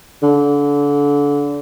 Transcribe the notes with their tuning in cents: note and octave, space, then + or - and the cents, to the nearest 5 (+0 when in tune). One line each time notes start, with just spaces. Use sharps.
D3 -30